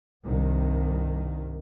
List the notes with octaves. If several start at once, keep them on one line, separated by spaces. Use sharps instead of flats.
C2 G2 D#3